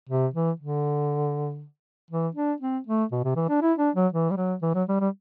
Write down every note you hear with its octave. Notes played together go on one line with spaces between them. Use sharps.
C3
E3
D3
E3
D4
C4
A3
B2
C3
E3
D4
E4
D4
F#3
E3
G3
F#3
E3
F#3
G3
G3